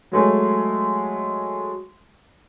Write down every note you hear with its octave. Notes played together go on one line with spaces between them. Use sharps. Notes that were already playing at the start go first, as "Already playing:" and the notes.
F#3 G#3 A3